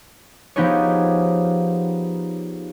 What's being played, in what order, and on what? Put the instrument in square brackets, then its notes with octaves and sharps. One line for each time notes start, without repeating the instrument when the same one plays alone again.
[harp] F3 B3 D#4 G4 G#4 C#5